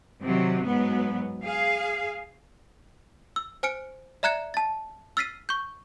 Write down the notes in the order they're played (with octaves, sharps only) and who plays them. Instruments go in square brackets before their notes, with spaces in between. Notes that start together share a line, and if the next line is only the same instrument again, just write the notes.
[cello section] C3 D#3 F#3
G#2 F#3 B3
G#4 F5
[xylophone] E6
C5 G#5 F6 C#7 D7
D5 E5 A#5 F#6 G#6 C#7
A5 A6
E6 F6 A6 B6 C7 D#7
C#6 G6